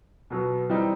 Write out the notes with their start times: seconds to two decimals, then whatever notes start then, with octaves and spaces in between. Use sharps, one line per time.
0.30 B2 F#3 B3
0.70 E3 G3 C4 D#4